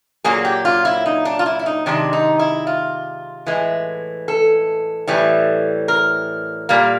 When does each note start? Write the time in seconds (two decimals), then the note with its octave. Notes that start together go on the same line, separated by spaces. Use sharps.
0.24 A#2 F#3 A#3 G#4
0.45 G4
0.65 F4
0.85 E4
1.06 D#4
1.25 D4
1.39 F4
1.46 E4
1.59 E4
1.66 D#4
1.86 C3 D#3 G#3 D4
2.13 D#4
2.39 E4
2.67 F4
3.47 A2 E3 G#3
4.28 A4
5.08 A2 E3 G3
5.88 A#4
6.69 A#2 G3 A#3